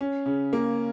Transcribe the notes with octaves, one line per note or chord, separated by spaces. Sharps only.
C#4
C#3
A#3